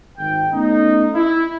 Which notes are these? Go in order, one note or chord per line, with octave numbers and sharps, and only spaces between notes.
G#1 G5
A3 B3 C#4 D#4
E4